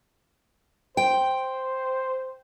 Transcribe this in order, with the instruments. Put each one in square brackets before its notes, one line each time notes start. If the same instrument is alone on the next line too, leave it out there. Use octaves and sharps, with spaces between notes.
[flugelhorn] C5 [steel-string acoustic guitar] G5